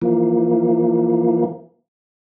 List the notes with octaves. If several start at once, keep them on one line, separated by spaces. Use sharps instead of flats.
E3 F3 A#3